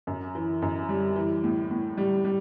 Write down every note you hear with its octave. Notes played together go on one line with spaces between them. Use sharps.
F#2
E3
F#2
G3
E3
A2
A2
G3
G3